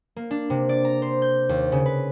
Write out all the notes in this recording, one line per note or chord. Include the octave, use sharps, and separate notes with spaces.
A#3
D4
C3
D5
A#5
C5
G6
D#2
C#3
B4